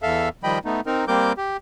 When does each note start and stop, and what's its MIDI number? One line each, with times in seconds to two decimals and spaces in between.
0.02 0.29 40
0.02 0.29 69
0.02 0.29 76
0.02 0.29 77
0.44 0.59 51
0.44 0.59 53
0.44 0.59 55
0.44 0.59 75
0.44 0.59 79
0.44 0.59 83
0.65 0.81 57
0.65 0.81 59
0.65 0.81 63
0.86 1.05 60
0.86 1.05 63
0.86 1.05 70
1.08 1.32 55
1.08 1.32 58
1.08 1.32 60
1.08 1.32 70
1.08 1.32 86
1.08 1.32 91
1.37 1.57 67